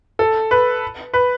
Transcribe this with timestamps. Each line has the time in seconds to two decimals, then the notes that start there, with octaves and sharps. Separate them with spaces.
0.19 A4
0.51 B4
1.14 B4